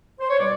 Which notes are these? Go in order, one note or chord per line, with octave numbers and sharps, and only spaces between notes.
C5
C#5
B2 G3 D5